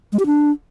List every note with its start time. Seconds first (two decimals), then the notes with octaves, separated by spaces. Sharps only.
0.13 G#3
0.19 G4
0.26 D4